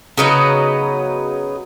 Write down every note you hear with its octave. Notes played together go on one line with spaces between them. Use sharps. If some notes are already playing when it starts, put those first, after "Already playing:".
C#3 F#3 B3 D#4